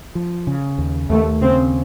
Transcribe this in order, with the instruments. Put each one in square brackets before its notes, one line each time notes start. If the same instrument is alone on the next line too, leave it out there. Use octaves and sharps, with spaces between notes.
[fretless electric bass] F3
C#3
D#2
[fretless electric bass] D#2 [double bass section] A3
[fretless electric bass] C#3 [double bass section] C4